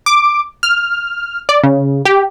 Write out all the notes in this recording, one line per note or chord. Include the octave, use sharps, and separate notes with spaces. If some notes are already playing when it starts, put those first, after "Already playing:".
D6
F6
D5
C#3
G4